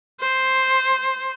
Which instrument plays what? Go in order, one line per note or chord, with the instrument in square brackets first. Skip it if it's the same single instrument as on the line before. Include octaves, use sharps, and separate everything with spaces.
[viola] C5